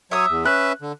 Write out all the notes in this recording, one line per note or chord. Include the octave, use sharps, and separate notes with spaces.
F#3 C#5 E5 D#6
E2
C#4 B4 E5 F#6
D3